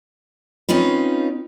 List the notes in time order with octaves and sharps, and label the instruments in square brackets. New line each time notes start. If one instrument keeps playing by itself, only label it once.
[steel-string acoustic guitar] C4 C#4 D#4 F4 B4